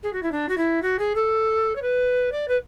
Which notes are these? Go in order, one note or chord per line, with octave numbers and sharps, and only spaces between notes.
G#4
F#4
E4
D4
F#4
E4
F#4
G#4
A4
C#5
B4
D5
B4